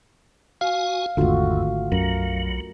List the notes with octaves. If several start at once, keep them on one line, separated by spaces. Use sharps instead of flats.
F#4 F5 G#5
G#1 E2 D3 A3 F4 F#4
B1 F#2 F#3 A#4